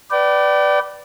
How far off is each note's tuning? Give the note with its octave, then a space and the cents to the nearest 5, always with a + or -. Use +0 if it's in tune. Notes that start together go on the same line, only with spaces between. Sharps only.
B4 +0 D5 +0 G5 -35